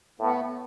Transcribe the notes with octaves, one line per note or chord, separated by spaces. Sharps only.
A2 B3